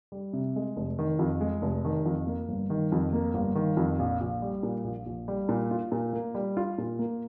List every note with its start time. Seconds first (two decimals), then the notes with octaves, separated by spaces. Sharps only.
0.12 G3
0.33 C3
0.56 G#3
0.76 F1
0.99 D#3
1.19 F2
1.41 G#3
1.62 F1
1.85 D#3
2.06 F2
2.27 A#3
2.49 G1
2.70 D#3
2.92 F2
3.13 A#3
3.34 G1
3.55 D#3
3.77 F2
3.99 A#1
4.21 A#1
4.42 G3
4.63 A#2
4.84 A#1
5.06 A#1
5.28 G3
5.49 A#2
5.71 F4
5.92 A#2
6.13 A#3
6.35 G3
6.57 F4
6.78 A#2
6.99 A#3